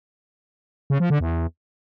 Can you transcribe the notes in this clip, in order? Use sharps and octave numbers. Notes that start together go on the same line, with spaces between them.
C#3
F3
D3
E2